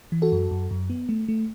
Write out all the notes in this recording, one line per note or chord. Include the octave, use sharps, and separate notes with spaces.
E3
F#4 A4
F#2
F#2
F#2
B3
A3
A3